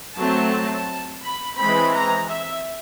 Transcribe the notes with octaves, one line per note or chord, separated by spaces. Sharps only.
F#3 A3 C4 A5
B5
E3 G#3 C4 B5
A#5
E5